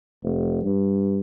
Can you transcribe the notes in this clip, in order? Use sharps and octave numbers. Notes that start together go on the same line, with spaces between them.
F1
G2